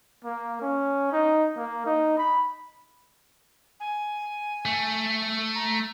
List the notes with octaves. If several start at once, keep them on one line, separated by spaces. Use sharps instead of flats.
A#3
C#4
D#4
A#3
D#4
B5
G#5
A3
A#5